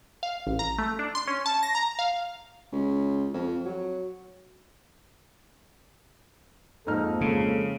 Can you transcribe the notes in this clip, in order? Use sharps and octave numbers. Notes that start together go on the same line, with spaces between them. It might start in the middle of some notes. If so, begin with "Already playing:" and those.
F5
A1
A#5
A3
D4
C6
C#4
A5
A#6
A#5
F5
C#2
F2
F#3
F2 G#2 A#3 D#4 A4 F6
C#3 G#3